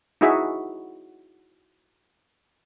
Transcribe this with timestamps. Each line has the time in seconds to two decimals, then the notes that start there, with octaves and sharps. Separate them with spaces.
0.21 D#4 E4 F#4 G#4 E5